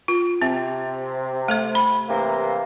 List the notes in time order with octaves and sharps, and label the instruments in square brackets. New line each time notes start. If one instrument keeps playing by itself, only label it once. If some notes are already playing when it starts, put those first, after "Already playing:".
[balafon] F4
[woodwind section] C3 [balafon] C4
[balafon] A3 A4 C5
B5
[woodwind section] C3 E3 A#3